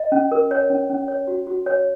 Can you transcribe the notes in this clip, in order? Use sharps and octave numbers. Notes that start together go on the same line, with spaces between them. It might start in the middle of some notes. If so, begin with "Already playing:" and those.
Already playing: D#5
C#4
A#4
C#5
C#4
C#4
C#5
F#4
F#4
C#5